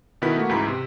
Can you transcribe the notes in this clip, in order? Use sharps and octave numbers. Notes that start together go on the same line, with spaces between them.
B2 D#3 B3 E4 B4 B6
A3 A#3 F#4
C#2 G#2 E3 A#5 B5 B6
C3